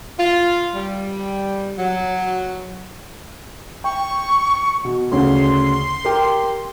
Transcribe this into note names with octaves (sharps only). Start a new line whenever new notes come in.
F4
G3
F#3
G5 C#6
B2
D2 C#3 C6
G4 A#4